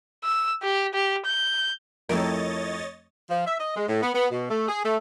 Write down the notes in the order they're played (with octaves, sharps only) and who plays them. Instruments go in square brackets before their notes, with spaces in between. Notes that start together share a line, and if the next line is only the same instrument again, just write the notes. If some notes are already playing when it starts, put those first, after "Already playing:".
[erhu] E6
G4
G4
G6
[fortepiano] F2 A3 [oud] E4 G4 A#4 [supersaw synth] C#5 D#5 A6
[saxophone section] F3
E5
D#5
G#3
A2
B3
B3
B2
A3
G#4
A3